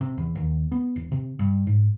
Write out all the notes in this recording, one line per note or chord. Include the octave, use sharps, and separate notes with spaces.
C3
E2
D#2
B3
E1
C3
G2
G#2